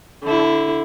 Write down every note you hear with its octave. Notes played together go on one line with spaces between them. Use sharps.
D3 E4